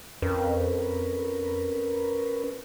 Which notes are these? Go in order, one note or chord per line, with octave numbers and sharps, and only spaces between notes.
F2 C#4 A#4 B4